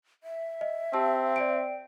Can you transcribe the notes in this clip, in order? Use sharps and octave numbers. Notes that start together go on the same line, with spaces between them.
E5
D#5
C4 G4 A5 E6
D5 G5 D7